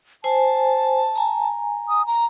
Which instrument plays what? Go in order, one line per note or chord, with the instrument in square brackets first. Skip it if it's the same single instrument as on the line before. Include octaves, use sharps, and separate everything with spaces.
[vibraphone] C5 G#5 [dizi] A5
[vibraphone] G#5 A#5
[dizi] D#6
A#5